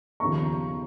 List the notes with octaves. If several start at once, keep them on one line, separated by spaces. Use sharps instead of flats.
D#2 C#3 F3 B3 A#5 C#6